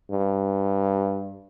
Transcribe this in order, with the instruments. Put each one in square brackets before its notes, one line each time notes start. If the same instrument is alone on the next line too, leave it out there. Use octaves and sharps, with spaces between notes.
[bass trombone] G2